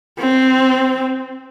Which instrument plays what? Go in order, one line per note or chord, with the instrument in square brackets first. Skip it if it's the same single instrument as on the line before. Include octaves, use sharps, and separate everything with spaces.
[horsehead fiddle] C4